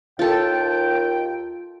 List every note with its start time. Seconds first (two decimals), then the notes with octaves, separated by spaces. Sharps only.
0.19 D#2 F4 A4 G5